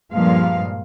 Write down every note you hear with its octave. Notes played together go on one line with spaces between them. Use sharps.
G2 A#2 F3 G#3 F5